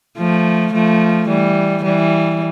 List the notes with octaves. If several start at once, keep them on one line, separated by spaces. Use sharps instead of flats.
F3 A3
F3 A3
E3 G3
E3 G3